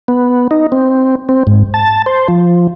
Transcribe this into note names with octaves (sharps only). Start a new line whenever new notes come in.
B3
D#4
C4
C4
G#2
A5
C5
F3